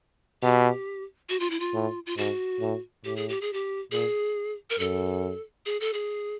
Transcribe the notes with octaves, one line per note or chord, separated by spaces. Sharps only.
B2 G4
F#4
F4
E4
F4
A2
F4
G#2 F#4
A2
A2 G4
G#4
G4
G#4
G4
A#2 G#4
A#4
F#2 A4
G#4
A4
G#4